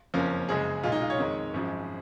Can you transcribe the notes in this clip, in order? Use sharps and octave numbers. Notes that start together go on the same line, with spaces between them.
F#1 F2 F3 A#3 C#4
F#1 F#2 C#3 G#3 G#4
B1 A#2 G#3 F4
D#4
F4
C#5
F2 D#3 G#3
G#1 F#2 F3 G#3